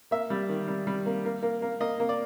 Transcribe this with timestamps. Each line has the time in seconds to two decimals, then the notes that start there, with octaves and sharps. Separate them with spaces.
0.11 A#3 E5
0.30 G3
0.49 D#3
0.68 G3
0.87 G3
1.06 A#3
1.25 A#3
1.43 A#3
1.62 A#3
1.80 A#3 D#5
2.00 A#3
2.09 D5